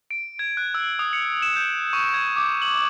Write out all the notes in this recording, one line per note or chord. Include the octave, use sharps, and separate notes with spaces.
D7
G#6
F#6
E6
D#6
C#7
E7
G6
C#6
G#6
D6
F#7